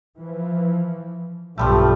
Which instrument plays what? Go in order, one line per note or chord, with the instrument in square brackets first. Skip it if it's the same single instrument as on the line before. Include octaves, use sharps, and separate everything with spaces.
[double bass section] E3 F3
[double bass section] B1 G2 [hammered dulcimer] F3 G3 A3